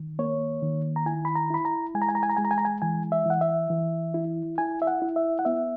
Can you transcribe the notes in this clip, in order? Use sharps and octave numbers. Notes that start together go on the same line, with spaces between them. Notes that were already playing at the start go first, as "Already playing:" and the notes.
Already playing: D#3
A#3 C#5
D#3
A#5
E4 G#5
B5
A#5
E4 B5
A#5
G#3 G#5
A#5
G#5
A#5
G#5
A#5
G#3 G#5
A#5
G#5
A#5
G#5
E3 G#5
E5
E3 F#5
E5
E3
E4
E4 G#5
E5
F#5
E4
E5
F#5
B3 E5